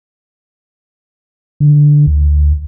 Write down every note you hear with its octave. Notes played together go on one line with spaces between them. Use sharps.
D3
D2